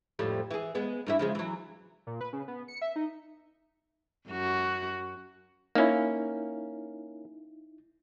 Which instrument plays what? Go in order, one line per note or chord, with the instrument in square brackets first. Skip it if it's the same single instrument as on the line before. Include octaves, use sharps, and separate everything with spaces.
[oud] F2 A2 G3
E3 G#4
G#3 B3
G2 E3 E5
C#3 F3 G#3
E3 F#3
[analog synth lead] A#2
B4
C#3
B3
C#7
E5
D#4
[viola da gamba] F#2 F#4
[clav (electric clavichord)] A#3 C#4 [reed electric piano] D#4 E4